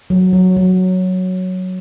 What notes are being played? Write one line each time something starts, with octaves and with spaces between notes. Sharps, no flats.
F#3
F#3
F#3